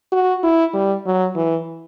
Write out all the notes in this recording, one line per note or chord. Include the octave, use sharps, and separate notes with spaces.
F#4
E4
G3
F#3
E3